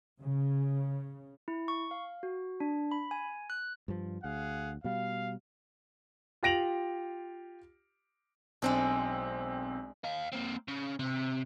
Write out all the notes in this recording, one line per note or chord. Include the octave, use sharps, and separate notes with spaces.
C#3
E4
C#6
F5
F#4
D4
B5
G#5
F#6
G2 F3
D2 G#4 F5 F#5
B2 G3 F5
F4 G4 A#6 D7 F7 F#7
B1 G#3 C4 D4 A4
D#5 F5
A#3 C4
C#3
C3